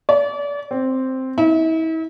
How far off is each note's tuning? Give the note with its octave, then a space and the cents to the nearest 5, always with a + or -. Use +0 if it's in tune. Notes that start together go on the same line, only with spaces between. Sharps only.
D5 -35
C4 +0
E4 -40